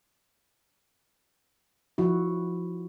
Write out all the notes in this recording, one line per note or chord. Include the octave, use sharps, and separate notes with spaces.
F3 E4 F#4